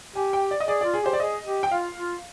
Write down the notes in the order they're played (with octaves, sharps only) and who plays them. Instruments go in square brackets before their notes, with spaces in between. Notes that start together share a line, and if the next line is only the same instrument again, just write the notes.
[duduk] G4 [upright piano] G#5
[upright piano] G5
D5
D#5
[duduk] G#4 [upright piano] D5
[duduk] F4 [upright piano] D5
[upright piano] G#4
[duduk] G4 [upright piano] C5
[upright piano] D5
[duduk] G#4 [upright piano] D#5
[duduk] G4
[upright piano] G5
[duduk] F4 [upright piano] F5
[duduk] F4